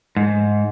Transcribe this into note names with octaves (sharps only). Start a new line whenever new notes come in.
G#2